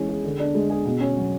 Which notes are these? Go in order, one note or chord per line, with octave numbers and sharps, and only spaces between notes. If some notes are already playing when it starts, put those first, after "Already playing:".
Already playing: E3 G#3 C#4
G#4
D3
D4
G#3
G#4
B2
C#4
F#3